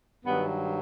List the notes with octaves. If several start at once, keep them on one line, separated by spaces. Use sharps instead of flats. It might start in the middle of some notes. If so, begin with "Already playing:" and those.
G2 D#3 F#3 B3